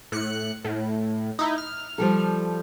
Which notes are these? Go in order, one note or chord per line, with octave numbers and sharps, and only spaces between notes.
A2 F#6 C#7
A2
D#4 E4
F6
F3 G3 A4